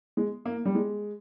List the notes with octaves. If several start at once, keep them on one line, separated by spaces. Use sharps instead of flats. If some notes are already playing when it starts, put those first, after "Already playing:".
G#3
A#3
G3
G#3